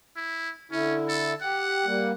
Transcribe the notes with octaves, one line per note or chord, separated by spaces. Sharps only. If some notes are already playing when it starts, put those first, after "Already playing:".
E4
D3 C#4 E4
A4
G4 F#5
G3 A#3